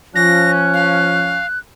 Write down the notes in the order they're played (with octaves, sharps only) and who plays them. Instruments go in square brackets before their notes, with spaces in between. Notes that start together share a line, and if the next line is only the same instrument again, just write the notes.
[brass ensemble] F3 C#4 [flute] F#6 [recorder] A#6
[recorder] F5